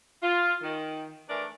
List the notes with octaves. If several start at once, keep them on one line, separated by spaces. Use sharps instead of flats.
F4
D#3
E3 A3 D4 A#4 D5